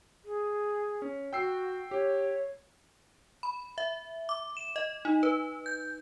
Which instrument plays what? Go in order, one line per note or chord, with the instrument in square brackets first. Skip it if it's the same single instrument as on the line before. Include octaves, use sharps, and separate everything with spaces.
[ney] G#4
[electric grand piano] C#4
[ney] F#4 [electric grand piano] G5 E6 C7
[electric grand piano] G4 [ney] C#5
[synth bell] B5
E5
D6
E7
D#5
D#4
B4
G6